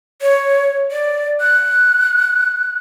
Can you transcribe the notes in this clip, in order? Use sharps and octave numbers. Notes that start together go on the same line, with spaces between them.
C#5
D5
F#6